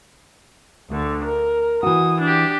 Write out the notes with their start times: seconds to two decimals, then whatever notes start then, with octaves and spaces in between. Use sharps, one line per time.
0.89 D2 D3
1.24 A#4
1.83 E3 F#4 D#6
2.21 D4 G4